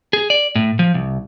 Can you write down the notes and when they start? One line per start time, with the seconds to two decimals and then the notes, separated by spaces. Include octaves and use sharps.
0.13 G#4
0.30 D5
0.55 A2
0.79 F3
0.94 C2